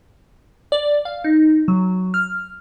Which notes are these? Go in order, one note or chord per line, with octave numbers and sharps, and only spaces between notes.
D5
F5
D#4
F#3
F6